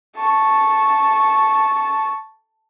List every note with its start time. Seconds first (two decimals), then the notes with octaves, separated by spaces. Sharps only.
0.17 A5 C#6